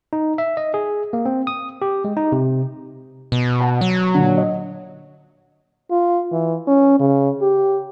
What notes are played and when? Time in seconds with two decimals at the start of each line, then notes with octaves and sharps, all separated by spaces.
0.13 D#4
0.38 E5
0.57 D#5
0.74 G#4
1.13 A#3
1.26 C4
1.47 D#6
1.82 G4
2.05 G#3
2.16 D#4
2.32 C3
3.32 B2
3.60 F#5 A5
3.81 F#3
4.14 A#2 D3
4.37 D#5
5.91 F4
6.32 E3
6.67 C#4
7.00 C#3
7.42 G4